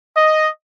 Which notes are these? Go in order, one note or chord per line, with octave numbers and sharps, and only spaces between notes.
D#5